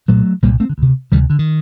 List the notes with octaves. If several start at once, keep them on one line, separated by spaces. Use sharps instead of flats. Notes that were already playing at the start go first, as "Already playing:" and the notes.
C2 A#2 F#3 A3
C2 A#2 G3 A#3
A3 C4
D3
D2 C3
D2 C3 D#3 G3
D3
D#3